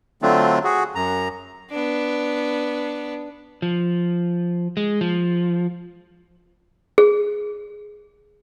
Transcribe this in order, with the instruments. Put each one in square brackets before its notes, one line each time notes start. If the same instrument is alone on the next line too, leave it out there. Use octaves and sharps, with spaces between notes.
[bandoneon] D3 F#3 A3 C4 D4 F4
F#4 G#4
F#2 A#5
[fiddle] B3 D4
[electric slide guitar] F3
G#3
F3
[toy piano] G#4